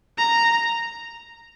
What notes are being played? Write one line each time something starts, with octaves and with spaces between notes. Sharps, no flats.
A#5